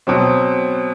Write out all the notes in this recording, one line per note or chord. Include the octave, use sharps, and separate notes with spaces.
B2 F#3 C4